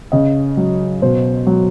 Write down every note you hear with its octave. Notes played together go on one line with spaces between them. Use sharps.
C#3 D#5
F#3
B2 C5
F#3